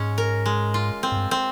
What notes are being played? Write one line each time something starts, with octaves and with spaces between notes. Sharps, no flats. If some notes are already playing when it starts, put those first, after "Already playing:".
Already playing: G#2 G#3 C#4
A#4
G#3
F4
C4
G#2
G2
C4